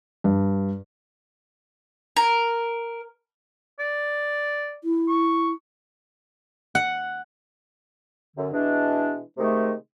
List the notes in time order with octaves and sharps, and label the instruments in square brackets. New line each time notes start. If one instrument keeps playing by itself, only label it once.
[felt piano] G2
[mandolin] A#4
[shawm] D5
[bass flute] E4
[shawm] C#6
[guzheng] F#5
[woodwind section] F#2 D3
B2 E3 G#3 D4
C3 D#3 G#3 A3